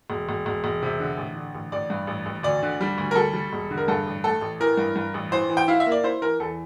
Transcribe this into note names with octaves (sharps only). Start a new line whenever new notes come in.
E1
E1
E1
E1
C3
D3
A1
D3
A1
A1 D5
G2
A1
A1
D2 D5
D3
G3
D2
A#4
G3 A4
G3
E1
D3
A#4
G2 A4
A1
A3 A4
A1
E3 A#4
G2
G2
A1
E3 C5
E3
G5
E4 F5
E5
A#3
D5
E4 C5
E3 A#4
E2 A4